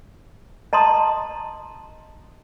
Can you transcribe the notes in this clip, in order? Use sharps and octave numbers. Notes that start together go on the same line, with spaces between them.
D#5 A5 A#5 C6 D#6